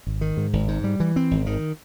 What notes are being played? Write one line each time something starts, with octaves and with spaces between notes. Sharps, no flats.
G#1
D#3
G#2
G#1
G#2
G3
E3
C4
G#1
D#3